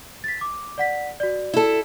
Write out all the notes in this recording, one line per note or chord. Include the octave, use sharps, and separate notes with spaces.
A6 B6
D6
D5 F#5 B6
F#4 D5
E4 A4